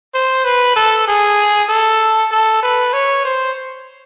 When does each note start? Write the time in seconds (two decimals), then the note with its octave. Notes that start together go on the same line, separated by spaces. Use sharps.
0.15 C5
0.45 B4
0.76 A4
1.08 G#4
1.69 A4
2.31 A4
2.63 B4
2.93 C#5
3.25 C5